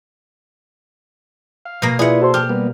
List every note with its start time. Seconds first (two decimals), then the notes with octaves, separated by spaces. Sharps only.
1.66 F5
1.82 B2 A#3
1.99 E4 F4 G#4 B4 D5 E5 F#5
2.22 F#4 A4 C5 C6
2.34 G4 F6
2.49 G3 A#3 B3